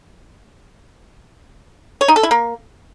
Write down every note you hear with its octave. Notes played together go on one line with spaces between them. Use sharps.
C#5
D#4
A4
E4
A#3